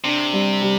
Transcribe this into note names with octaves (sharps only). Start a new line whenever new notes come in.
C3 D4
G3
G3